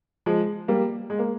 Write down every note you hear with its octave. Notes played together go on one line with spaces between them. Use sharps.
F3 G#3
G3 A#3
G#3
A#3